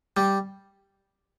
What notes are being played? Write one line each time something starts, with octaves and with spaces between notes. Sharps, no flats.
G3